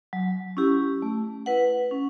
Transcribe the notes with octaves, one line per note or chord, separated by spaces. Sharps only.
F#3
C#4 E4 G4
A3
E4 B4 F#5
C#4